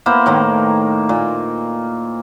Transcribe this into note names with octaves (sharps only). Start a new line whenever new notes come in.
A#3 B3 E4 C5
A2 D#3 A#3 A#5
A#2